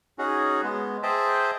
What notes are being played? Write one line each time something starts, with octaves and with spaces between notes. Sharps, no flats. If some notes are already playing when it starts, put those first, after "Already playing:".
C#4 D#4 F#4 G#4
G#3 B3
G#4 C5 D#5 E5 G5 A5